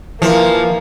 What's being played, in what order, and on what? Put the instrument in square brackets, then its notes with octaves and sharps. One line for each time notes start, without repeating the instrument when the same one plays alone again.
[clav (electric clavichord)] E3 [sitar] F3 [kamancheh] A#3